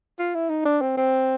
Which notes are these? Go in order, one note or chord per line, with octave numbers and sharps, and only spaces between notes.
F4
E4
D#4
D4
C4
C4